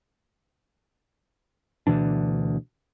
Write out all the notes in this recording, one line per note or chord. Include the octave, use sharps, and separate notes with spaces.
D2 B2 E3 D4